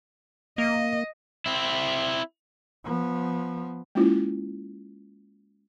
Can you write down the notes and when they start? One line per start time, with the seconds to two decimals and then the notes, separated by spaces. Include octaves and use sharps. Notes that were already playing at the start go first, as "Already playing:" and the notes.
0.58 A#3 D#5
1.46 C4 E4
2.84 F3 B3
3.95 G#3 A#3 C#4 E4 F4